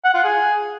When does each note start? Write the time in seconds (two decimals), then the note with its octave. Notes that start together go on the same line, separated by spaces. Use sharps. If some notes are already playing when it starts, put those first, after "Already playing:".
0.05 F#5
0.14 F4
0.24 G#4